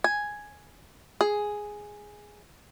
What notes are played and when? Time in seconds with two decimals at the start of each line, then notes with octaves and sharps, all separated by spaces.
0.04 G#5
1.21 G#4